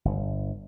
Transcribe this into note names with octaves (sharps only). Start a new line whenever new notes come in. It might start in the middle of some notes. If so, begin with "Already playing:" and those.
G1